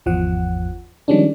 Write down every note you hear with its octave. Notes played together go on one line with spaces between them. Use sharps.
G#1 E2 F3 F#5
D#3 F3 G3 G#3 C#4 D4